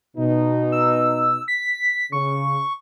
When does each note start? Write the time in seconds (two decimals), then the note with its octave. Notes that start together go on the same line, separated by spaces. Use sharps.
0.17 B2 D#4
0.72 E6
1.48 B6
2.12 C#3 C#6